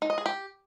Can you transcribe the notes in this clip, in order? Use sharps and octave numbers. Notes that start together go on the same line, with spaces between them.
D#4
D#5
G#4
G4